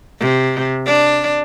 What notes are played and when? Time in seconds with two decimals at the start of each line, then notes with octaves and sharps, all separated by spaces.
0.19 C3
0.86 D4